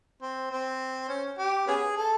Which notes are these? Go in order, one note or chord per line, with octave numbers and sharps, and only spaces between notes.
C4
C4
C#4
G4
B3 C#4 G#4
A4